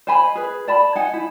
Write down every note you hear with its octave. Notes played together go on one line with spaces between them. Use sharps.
C5 D#5 G#5 B5
G#4 B4
D5 A5 B5
D#4 F#5 G#5
E4